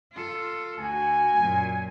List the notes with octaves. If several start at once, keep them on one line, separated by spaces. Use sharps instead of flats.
F4 A4
D2 F#4 G#5
F#2 A#2